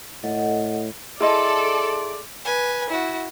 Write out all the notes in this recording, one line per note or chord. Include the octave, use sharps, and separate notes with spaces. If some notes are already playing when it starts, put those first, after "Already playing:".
A2 A4 D#5 F#5
E4 G#4 A4 D5 D#5 C6
B4 G#5
E4 F#4